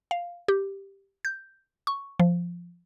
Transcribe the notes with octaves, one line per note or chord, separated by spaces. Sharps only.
F5
G4
G6
C#6
F3